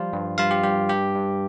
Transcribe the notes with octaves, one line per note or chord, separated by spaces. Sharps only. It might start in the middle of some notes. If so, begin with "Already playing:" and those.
Already playing: F3 G3 F4 F5
G2
G2 F4 F5
G4
G2 G4
G2 G4
G2